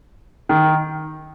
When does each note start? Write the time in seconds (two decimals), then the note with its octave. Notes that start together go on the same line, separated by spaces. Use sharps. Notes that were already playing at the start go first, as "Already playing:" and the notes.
0.49 D#3